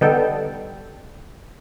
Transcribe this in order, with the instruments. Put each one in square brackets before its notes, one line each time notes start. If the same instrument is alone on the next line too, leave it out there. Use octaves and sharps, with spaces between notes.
[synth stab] D3 G3 B3 D#4 A4 G5